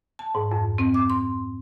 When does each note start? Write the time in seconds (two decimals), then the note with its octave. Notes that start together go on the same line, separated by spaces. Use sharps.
0.19 A5
0.35 G#2
0.51 F2
0.78 C4
0.94 D6
1.10 C6